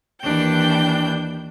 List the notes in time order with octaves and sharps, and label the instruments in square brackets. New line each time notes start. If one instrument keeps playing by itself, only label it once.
[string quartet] D#2 E3 D4 G5 G6